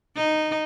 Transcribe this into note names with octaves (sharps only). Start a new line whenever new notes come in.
D#4